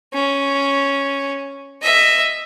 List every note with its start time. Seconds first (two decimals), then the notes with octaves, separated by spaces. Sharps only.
0.13 C#4
1.82 D#5 E5